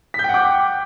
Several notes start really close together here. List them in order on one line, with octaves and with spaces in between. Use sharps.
B6 G6 G5 F#5 D6